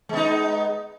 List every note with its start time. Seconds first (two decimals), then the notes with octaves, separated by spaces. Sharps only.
0.09 G#3
0.13 B3
0.17 D#4